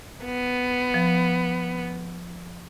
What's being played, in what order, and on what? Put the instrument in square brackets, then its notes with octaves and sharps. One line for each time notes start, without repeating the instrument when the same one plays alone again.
[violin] B3
[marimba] F3